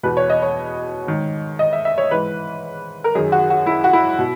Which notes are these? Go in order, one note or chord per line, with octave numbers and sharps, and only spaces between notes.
E2 B2 B4
C#5
D#5
C#5
G#2 D#3
D#5
E5
E5
C#5
G#2 E3 B4
A#4
F#2 D#3 G#4
F#4
F#4
E4
F#4
E4
B2